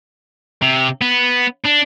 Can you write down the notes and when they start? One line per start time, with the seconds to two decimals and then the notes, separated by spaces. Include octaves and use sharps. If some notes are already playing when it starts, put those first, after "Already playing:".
0.62 C3
1.02 B3
1.65 D4